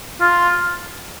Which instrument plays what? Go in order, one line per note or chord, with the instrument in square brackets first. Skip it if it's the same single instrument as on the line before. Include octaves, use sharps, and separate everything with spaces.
[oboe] F4